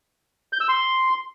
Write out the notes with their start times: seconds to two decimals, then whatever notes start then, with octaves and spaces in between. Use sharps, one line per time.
0.53 G6
0.61 E6
0.69 C6